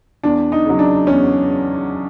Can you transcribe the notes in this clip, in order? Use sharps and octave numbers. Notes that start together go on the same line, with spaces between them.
E2 D4
D#4
C#3 F#3
D4
E2 C#4